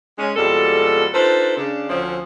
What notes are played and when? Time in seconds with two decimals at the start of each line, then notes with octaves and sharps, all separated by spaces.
0.19 G#3 C#4
0.36 F2 B2 G3 G#3 A4
1.13 D4 D#4 F4 A4 B4 C5
1.57 C#3 D4
1.89 D2 D3 F3 C4 C#4